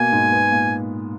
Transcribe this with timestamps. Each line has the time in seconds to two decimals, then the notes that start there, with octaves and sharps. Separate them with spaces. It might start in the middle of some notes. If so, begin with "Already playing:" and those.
Already playing: B2 A#3 G#5
0.12 G#2
0.32 B3
0.52 A#2